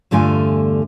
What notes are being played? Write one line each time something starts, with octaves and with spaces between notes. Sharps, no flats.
E2 G2 D3 A3 F4 G#5